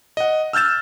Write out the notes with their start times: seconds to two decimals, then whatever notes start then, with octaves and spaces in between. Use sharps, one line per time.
0.17 D#5 F#5
0.53 E6 F6 G6 A6 E7